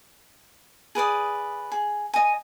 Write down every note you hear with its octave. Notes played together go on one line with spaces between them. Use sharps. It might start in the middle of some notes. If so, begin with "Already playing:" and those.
G#4 B4 D5 D#6
G#4
D#5 G#5